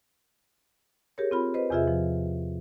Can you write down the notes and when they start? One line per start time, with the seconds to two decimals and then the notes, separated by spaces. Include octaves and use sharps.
1.18 G4 G#4 A#4 C#5
1.31 C4 F4 B5
1.54 B4 C5 D#5
1.70 E2 C3 F4 G#4 E5
1.88 F3